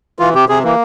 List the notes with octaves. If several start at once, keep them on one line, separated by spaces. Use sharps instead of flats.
E3 F4
C3 G4
C3 G#4
E3 A#3